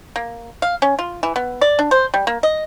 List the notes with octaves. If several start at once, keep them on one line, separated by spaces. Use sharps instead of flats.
A#3
F5
C#4
F4
E3
B3
D5
D4
C5
G3
A#3
D#5